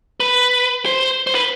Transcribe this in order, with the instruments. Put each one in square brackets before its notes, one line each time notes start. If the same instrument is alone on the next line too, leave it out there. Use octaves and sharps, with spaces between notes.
[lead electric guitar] B4
C5
C5
B4